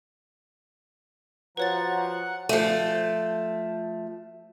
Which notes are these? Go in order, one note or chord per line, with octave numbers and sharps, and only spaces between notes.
F3 F4 F#4 B4 C#5 F#5 A#5 A6
F3 A3